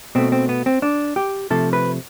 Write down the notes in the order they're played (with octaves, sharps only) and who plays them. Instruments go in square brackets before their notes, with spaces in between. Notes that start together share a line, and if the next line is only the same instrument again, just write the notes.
[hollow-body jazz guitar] B2 A3 C4
C4
B3
C4
D4
G4
C3 F3 A3 A4
B4